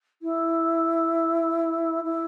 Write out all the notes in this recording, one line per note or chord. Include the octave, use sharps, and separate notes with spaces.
E4
E4